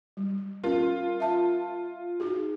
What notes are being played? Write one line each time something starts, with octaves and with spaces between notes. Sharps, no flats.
G3
C#4 F4 A#4
E5 A5
D#4 F#4 G#4